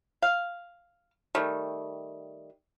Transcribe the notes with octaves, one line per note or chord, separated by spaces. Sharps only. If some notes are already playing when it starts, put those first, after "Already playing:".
F5
D#3 G3 A3